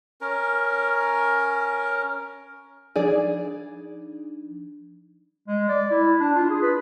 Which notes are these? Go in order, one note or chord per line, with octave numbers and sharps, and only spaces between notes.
C#4 A#4
F3 D4 D#4 G#4 D5
G#3
D5
E4
D4
F4
G#4
B4